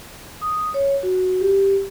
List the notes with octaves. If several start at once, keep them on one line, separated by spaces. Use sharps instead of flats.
D#6
C#5
F#4
G4